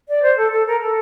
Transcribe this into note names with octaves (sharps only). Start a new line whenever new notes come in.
D5
C5
A4
A4
A#4
A4